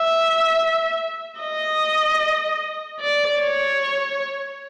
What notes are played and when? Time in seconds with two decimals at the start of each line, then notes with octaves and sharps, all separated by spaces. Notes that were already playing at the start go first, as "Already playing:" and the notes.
Already playing: E5
1.40 D#5
3.00 D5
3.41 C#5